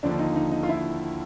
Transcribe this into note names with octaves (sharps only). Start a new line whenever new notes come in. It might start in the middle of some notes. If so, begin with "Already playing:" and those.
D#2 D3 F3 D4
D#4
D#4
D#4
F4
E4